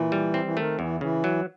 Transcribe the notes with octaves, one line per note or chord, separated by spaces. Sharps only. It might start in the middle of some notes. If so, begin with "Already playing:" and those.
Already playing: A#2 E3
G3
C4
E3
D#3 A3
E2 E3
C#3 E3
F#3